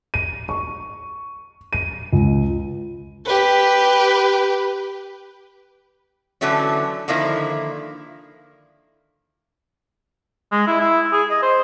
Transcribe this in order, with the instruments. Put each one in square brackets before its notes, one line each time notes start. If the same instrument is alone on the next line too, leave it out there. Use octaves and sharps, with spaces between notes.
[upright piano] D#7
C#6
D#7
C#2
[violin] G4 B4
[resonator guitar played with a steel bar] D3 E3 F#3 A3 C#4
D3 D#3 F3 A#3 E4
[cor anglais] G#3
E4
E4
G#4
D#5
C5